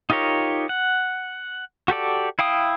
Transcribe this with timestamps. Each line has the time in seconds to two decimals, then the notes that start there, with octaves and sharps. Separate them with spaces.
0.10 D#4 F4 G4 A#4 C#5
0.69 F#5
1.88 F#4 G4 A4 D5
2.39 E4 F5 G5 D#6